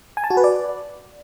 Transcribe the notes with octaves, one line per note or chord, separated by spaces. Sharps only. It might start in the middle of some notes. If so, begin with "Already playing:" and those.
G#5
A5
F#4
B4
D5